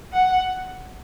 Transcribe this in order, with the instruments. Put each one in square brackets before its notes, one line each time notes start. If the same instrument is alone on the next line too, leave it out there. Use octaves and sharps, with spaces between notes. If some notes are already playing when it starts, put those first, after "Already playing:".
[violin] F#5